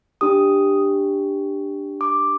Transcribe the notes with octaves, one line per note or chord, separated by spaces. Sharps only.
D4 G4 D#6
D6